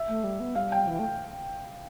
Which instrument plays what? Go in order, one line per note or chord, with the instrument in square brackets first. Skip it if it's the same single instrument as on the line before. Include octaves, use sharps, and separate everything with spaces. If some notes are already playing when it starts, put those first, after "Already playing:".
Already playing: [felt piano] E5
[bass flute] A3
G3
B3
[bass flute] G3 [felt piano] F5
[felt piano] G5
[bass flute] E3
A3